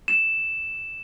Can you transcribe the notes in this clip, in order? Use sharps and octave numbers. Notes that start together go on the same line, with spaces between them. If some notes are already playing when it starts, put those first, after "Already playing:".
E7